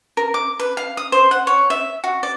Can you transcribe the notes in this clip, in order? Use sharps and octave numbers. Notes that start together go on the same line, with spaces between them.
A#4
D6
B4
F5
D#6
C5
F#5
C#5
E5
F#4
D5